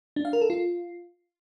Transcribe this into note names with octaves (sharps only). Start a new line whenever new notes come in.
D4
F5
A#4
A4
F4